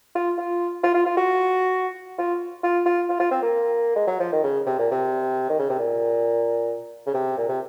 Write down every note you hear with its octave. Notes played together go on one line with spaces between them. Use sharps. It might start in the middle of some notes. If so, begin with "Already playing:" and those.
F4
F4
F4
F4
F4
F#4
F4
F4
F4
F4
F4
C4
A#3
G#3
F#3
F3
D#3
C#3
C3
A#2
C3
D#3
C#3
C3
A#2
C#3
C3
A#2
C3